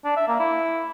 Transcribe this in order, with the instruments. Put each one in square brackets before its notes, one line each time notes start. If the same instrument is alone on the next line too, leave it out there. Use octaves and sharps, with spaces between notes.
[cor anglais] D4
E5
A#3
E4